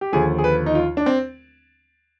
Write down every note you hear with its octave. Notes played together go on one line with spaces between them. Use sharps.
G4
D#2 D3 F3 G#4
G#4
B4
D#4
F4
D4
C4